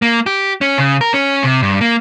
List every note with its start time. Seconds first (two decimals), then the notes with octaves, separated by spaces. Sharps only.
0.02 A#3
0.26 G4
0.61 C#4
0.78 C#3
1.01 A#4
1.14 C#4
1.44 C3
1.62 G2
1.81 A#3